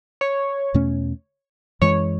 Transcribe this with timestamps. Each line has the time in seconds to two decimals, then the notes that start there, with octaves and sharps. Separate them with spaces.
0.21 C#5
0.74 E2 B2 A3 C#4
1.81 F#2 E3 G#3 C#5